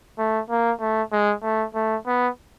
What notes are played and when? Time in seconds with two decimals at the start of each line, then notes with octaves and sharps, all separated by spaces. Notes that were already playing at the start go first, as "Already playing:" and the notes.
0.18 A3
0.50 A#3
0.80 A3
1.12 G#3
1.43 A3
1.75 A3
2.07 B3